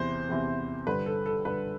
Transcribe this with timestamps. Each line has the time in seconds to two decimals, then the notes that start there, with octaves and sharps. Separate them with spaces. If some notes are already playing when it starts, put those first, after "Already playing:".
Already playing: E2 C3 E3 C5
0.29 E2 C3 E3
0.87 G2 D3 B4
1.06 A4
1.26 A4
1.45 G2 D3 B4